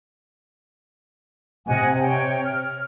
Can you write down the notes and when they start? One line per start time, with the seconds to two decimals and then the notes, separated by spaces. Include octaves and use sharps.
1.67 C3 D#5 F#5 G#5
2.01 C#5 G5
2.44 F6